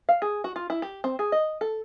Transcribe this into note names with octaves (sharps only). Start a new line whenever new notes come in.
F5
G#4
F#4
F4
E4
G4
C4
G#4
D#5
A4